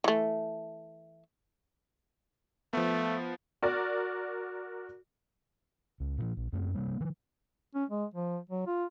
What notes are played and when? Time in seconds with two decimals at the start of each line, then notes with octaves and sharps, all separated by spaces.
0.04 E3 A3
2.73 F3 A3 B3
3.62 F#4 A#4 D5
6.00 C#2
6.18 A#2 E3 F3
6.37 A#1
6.53 F#2 A3 A#3 C4
6.74 C3 G3 A#3
7.00 D#3 F3
7.75 C#4
7.90 G#3
8.14 F3
8.49 F#3
8.67 F4